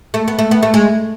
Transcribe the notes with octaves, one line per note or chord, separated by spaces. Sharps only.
A3
B3
A3
B3
A3
G#3